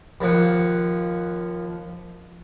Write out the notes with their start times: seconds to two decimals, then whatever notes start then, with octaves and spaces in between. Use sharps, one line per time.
0.21 D#2 F3 F#5